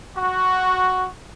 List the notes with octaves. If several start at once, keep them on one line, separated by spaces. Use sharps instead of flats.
F#4